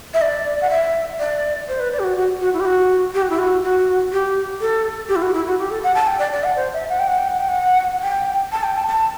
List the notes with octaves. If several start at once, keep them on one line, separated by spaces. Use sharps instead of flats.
E5
D5
F#5
E5
D5
C5
B4
D5
G4
F#4
F#4
F#4
E4
G4
F#4
G4
F#4
E4
F#4
F#4
G4
A4
G4
E4
F#4
E4
F#4
G4
A4
F#5
A5
G5
D5
D5
F#5
C5
E5
F#5
G5
F#5
G5
F#5
G5
F#5
G5
A5
G5
A5
A5